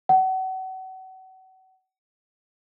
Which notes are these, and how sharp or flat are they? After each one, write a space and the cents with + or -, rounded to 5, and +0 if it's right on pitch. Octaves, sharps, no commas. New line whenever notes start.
F#5 +35